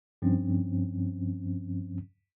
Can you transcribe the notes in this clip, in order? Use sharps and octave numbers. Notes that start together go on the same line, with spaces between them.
G2 F3 C4 C#4